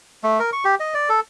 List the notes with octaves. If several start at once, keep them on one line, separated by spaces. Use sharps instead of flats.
A3
A#4
C#6
G4
D#5
D5
A4